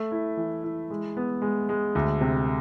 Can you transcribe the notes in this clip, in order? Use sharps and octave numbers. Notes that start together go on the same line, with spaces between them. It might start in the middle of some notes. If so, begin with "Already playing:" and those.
Already playing: A3
E4
E3
E4
G#3
B3
G#3
G#3
D2
C3